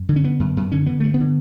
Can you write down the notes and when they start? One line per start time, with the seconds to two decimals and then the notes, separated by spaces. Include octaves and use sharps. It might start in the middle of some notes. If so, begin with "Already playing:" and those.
Already playing: F#2
0.09 D3
0.16 C#4
0.24 D3 B3
0.40 F#2
0.57 F#2
0.72 D3 C#4
0.86 D3 B3
1.00 G2 A3
1.14 B3
1.20 D3